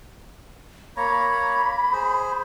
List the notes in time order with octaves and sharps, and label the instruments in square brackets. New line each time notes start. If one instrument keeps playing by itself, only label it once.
[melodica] A#3 C#5 A#5 [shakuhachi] B5
[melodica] G#4 C5